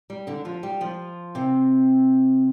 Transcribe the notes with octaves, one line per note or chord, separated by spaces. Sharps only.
G3
D3 D4
F3 F4
G3 G4
F3 F4
C3 C4